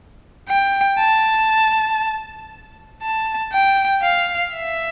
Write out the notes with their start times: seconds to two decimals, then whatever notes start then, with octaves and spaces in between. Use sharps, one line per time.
0.49 G5
0.98 A5
3.02 A5
3.53 G5
4.03 F5
4.54 E5